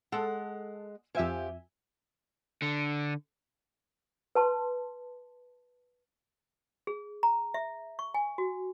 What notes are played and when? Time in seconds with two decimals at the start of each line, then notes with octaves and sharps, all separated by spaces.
0.12 G#3 A4 F#5
1.15 F2 F3 G4 E5 G#5
2.62 D3
4.35 B4 A5 C6
6.87 G#4
7.23 A#5
7.54 E5
7.99 C#6
8.14 G#5
8.38 F#4